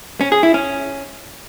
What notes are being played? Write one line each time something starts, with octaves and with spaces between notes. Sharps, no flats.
C#4
G#4
E4
C#4